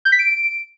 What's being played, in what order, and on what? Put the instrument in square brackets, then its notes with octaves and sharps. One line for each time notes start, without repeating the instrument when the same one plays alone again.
[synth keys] G6
B6
D7